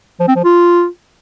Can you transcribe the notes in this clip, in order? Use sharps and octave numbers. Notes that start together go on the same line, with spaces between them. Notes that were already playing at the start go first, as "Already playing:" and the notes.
F3
C4
F3
F4